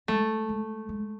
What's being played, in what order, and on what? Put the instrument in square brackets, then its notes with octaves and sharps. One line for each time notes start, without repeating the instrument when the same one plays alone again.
[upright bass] G#3 [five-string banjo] A3
[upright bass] G#3
G#3